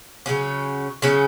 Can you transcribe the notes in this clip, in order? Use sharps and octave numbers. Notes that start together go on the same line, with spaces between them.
C#3 F#3 C#4
C#3 F#3 C#4